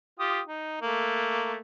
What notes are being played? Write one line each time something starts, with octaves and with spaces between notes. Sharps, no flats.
F4 G4 D#6
D#4
A3 A#3